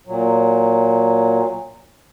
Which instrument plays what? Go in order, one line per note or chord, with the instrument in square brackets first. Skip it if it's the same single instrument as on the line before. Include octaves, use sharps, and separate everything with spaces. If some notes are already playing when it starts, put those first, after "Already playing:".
[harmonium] A#2 F#3